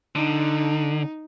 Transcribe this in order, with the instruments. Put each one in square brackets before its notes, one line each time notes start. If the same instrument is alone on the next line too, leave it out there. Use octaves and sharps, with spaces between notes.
[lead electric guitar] D3 [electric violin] D#4